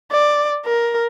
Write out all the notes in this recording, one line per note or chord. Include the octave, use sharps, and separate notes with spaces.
D5
A#4